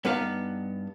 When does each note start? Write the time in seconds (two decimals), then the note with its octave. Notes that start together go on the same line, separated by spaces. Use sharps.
0.05 G2 B3 D#4 B4 F5 A#5